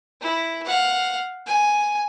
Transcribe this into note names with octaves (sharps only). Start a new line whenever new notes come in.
E4
F5 F#5
G#5